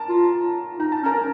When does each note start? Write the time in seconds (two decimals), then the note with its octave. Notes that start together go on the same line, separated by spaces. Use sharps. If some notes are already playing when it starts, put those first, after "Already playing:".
Already playing: A#4 A5 A#5
0.09 F4
0.79 D#4 A#5
0.92 A5
1.03 C#4 A#4 A#5